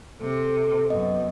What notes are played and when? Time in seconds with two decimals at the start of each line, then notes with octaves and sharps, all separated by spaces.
0.21 C3 A4
0.90 F#2 B3 D#5